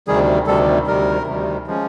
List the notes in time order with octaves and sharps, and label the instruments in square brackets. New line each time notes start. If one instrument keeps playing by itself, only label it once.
[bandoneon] D2 C3 D#3 G3 G#4
D2 C3 D#3 G3 A4
D2 C3 D#3 G3 A#4
D2 C3 D#3 G3
F3 G#3 C#4